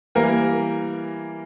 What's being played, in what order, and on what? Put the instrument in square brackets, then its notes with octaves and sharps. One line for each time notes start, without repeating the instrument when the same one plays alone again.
[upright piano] E3 G3 A#3 A#4